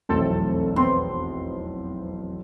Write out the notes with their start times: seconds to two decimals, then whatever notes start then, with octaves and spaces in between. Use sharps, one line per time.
0.09 F1 B1 E2 A3 C4 A4
0.76 B3 C4 C6